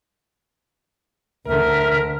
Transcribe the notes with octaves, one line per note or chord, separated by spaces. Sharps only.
D2 D3 A#4 E5 F6